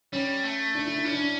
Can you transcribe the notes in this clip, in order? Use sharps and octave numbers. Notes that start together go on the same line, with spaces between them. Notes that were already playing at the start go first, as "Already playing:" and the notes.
G3 C#4
A3
D4
E4
D4
C#4 E4
D4